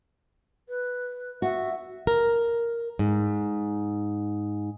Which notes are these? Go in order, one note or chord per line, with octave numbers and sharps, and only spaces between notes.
B4
F#4 E5
A#4
G#2